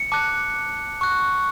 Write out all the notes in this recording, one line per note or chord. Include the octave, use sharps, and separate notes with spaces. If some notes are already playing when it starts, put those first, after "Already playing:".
Already playing: C#7
A5 D6 F#6
C#6 F#6